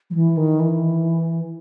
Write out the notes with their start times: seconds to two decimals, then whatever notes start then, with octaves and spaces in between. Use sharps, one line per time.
0.10 F#3
0.15 E3
0.37 D#3
0.60 E3